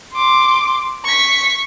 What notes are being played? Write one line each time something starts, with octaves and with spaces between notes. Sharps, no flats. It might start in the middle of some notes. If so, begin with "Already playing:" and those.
C6 D6
C#6 B6